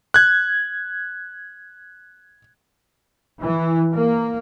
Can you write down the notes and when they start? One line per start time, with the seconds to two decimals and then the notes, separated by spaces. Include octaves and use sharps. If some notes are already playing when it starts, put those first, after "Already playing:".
0.14 F#6 G#6
3.41 E3
3.93 A#3